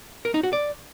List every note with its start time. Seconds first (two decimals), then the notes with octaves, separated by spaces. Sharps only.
0.25 A#4
0.34 D#4
0.43 F#4
0.53 D5